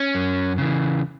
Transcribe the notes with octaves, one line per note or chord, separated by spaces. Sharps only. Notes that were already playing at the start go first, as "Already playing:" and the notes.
Already playing: C#4
F#2
C#3 E3